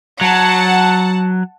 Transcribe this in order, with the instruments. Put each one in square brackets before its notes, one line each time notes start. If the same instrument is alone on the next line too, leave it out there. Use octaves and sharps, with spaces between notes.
[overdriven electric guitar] F#3 [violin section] F#5 A5